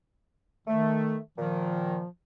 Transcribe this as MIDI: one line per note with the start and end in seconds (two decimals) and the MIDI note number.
0.67 1.20 51
0.67 1.17 57
1.38 2.01 46
1.38 2.01 51
1.38 2.06 53